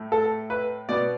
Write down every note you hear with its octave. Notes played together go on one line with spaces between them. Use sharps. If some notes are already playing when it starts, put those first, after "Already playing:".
Already playing: A2 A3
A4
B4
B2 B3 D5